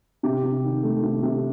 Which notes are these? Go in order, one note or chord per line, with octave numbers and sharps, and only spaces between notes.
C3 G4
C3
D#3
A3
C3
C3